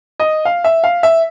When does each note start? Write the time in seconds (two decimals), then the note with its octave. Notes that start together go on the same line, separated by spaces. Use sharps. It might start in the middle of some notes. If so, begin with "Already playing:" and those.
0.20 D#5
0.45 F5
0.64 E5
0.84 F5
1.03 E5